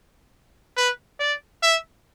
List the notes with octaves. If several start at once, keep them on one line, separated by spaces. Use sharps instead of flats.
B4
D5
E5